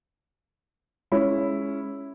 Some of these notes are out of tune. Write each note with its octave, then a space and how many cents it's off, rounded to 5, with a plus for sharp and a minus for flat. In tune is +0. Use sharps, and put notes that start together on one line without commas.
G#3 +0 C#4 +0 E4 +0